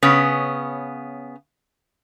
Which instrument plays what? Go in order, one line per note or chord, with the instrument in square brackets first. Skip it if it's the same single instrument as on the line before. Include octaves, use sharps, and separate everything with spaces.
[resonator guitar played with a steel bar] C#3 B3 C#4